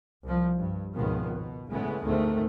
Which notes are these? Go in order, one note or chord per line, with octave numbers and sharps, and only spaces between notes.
C2 F3
G2
G#1 C#2 B2 D#3 F3 B3
B2
C#3 E3 G#3 A3 B3
D2 G#2 D#3 A3 C4